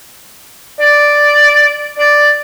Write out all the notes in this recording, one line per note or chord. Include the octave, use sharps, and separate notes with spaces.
D5
D5